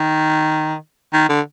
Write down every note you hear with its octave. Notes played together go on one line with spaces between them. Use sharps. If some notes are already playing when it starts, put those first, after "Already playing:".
Already playing: D#3
D#3
D3